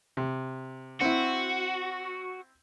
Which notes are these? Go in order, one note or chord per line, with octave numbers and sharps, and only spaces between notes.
C3
C4 E4 F#4